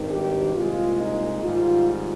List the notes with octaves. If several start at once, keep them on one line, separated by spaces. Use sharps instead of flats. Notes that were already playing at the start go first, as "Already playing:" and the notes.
Already playing: G#1 G2 D#3
G4
C2 A#2 G#3 F4
D#4
G#1 G#2 G3 F4